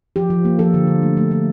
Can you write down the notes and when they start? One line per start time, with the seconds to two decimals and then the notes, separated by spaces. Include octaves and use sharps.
0.16 F3 G4
0.30 F3
0.45 A#3
0.59 F3 A4
0.74 D3
0.87 D3
1.02 A3
1.17 A3
1.31 A3